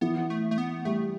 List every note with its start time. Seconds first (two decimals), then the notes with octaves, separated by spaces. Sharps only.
0.01 E3 B3
0.30 A3
0.51 A3
0.58 B3
0.85 G3 A3